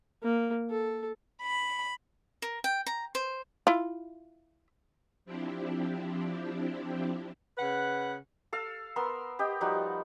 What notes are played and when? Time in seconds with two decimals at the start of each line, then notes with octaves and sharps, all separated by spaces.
0.23 A#3
0.70 A4
1.42 B5
2.42 A#4
2.64 G5
2.86 A#5
3.15 C5
3.67 E4 F4
5.25 F3 C4 D4 E4 G4
7.57 C#3 B4 F#5
8.53 A4 F5 E6
8.96 B3 A#4 C6 E6
9.39 G4 D#5 G5
9.61 F3 G3 D#4 F#4